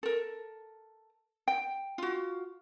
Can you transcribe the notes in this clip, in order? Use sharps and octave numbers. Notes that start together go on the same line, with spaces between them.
A4 A#4
G5
F4 F#4